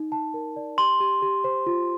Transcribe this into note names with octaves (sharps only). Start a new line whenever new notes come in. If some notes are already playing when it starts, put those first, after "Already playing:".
Already playing: D#4
A5
A#4
D5
G4 C6
G4
G4
C5
F4